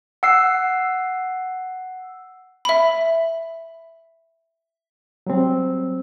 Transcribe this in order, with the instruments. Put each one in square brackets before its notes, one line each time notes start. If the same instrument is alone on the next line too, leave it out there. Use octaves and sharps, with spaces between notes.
[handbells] F#5 E6 C7
[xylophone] E5 B5
[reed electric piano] F#3 G3 C4